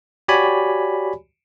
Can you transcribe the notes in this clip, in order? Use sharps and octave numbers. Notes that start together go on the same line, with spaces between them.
F#4 G4 C#5 D5 G#5 B5